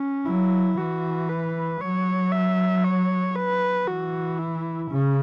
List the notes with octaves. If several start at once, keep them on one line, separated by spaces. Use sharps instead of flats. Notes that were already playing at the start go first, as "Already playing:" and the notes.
Already playing: C#4
F#3 E4
E3 F#4
B4
F#3 C#5
E5
C#5
B4
E3 F#4
E4
C#3 C#4